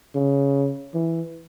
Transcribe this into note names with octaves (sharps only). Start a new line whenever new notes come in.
C#3
E3